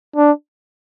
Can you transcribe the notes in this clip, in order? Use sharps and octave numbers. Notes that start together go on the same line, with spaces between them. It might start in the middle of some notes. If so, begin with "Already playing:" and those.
D4